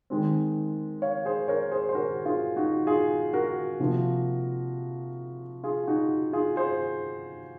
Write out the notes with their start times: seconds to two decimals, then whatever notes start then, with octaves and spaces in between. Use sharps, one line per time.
0.10 D#3 G#3 C4
1.02 C#5 F5
1.25 G#4 C5
1.48 A#4 C#5
1.71 G#4 C5
1.89 C5
1.95 F#4 A#4
2.26 F4 G#4
2.56 D#4 F#4
2.87 F4 G#4
3.33 F#4 A#4
3.80 C3 F3 A#3
5.64 F4 G#4
5.87 D#4 F#4
6.33 F4 G#4
6.56 G#4 C5